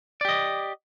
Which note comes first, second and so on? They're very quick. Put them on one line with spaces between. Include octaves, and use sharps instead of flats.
D5 G4 D#5